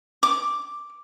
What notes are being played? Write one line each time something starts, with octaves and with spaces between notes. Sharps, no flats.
D6